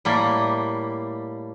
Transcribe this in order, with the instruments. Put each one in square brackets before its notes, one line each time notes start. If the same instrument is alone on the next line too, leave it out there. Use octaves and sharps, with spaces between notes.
[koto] A2 G3 A#3